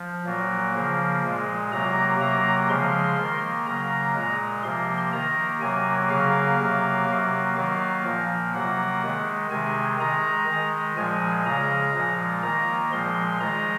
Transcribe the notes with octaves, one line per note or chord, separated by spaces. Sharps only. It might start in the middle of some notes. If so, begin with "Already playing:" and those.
Already playing: F3
A#2 F#3 A#3
C#3 F3 A#3
A#2 G#3
C3 F#3 A#3 A#5
C3 F#3 A#3 A#5
C#3 F3 G#3 C6
D#3 A#3
C#3 F#3 A#3 A#5
A#2 G#3
C3 F3 A#3 C6
D#3 A#3 A#5
C3 F#3 A#3 G#5
C#3 F#3 A#3 F5
C3 F#3 A#3
C3 F#3 A#3
D#3 F#3 A#3 F5
A#2 F3 A#3
C3 F#3 A#3 F#5
D#3 G#3
C3 D#3 G#3 G#5
D#3 G#3 A#5
D#3 G#3
A#2 F3 G#3 G#5
C#3 G#3 A#5
A#2 F3 G#3
D#3 A#3 A#5
A#2 F3 G#3 C6
D#3 G#3 A#5